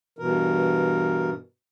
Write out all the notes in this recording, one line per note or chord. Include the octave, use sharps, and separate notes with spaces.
G2 B2 E3 A#4